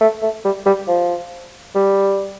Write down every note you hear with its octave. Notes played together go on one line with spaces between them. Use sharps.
A3
A3
G3
G3
F3
G3